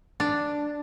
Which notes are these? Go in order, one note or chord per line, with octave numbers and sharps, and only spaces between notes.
D4